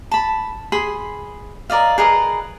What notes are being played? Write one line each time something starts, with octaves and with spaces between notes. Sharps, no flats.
A5 B5
G#4 B5 C6
A#4 D5 D#5 F5
G#4 A#4 B4 D#5